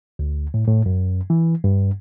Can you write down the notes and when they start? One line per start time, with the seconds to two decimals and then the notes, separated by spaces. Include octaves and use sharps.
0.19 D2
0.54 A2
0.68 A2
0.86 F#2
1.30 E3
1.64 G2